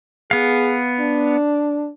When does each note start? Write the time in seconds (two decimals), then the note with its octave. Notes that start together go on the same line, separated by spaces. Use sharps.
0.31 B3 G#4 F5
1.00 D4